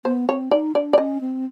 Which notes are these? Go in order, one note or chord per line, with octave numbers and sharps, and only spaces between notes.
B3 C5
C4 C#5
D#4 D5
D4 D5
D5
C#4 D#5
C4